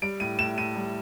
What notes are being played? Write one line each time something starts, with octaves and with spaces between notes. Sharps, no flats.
G3 D7
A2 D#7
A2 E7
A2 D#7
G3